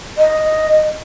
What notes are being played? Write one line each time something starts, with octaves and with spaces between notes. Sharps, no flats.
D#5